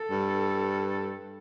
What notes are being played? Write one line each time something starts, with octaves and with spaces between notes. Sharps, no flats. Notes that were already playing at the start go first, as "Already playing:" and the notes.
Already playing: A4
G2